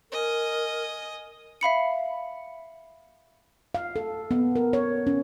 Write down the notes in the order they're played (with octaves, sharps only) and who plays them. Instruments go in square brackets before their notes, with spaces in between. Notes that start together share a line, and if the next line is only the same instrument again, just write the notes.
[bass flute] A#4 [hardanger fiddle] D#5 G#5
[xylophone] E5 F5 B5 C#7
[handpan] F5
A4
B3
A#4
C#5
C#4